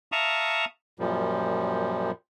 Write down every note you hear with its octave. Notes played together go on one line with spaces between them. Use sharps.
E5 F5 A5 A#5 C#6 D#6
F#2 A#2 F3 G3